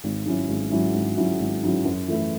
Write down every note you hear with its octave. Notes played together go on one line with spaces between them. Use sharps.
G#1
G#2 F#3 C#4 E4
G#1
G#2 F#3 C#4 E4
G#1
G#2 F#3 C#4 E4
G#1
G#2 F#3 C#4 E4
F#2
E3 A3 E4